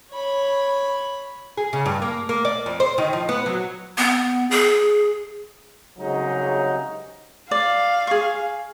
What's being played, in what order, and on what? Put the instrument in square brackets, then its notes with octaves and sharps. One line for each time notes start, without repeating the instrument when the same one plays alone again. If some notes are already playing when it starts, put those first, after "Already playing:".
[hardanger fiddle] C#5 B5
[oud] G#4
C#3
G2
A#3
A#3
D5
F2
C5
D#3
F3
B3
F#3
[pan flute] B3
G#4
[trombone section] C2 C#3 F#3 G#3 D#4
[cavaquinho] D5 [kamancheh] F5
[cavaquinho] G#4 C#6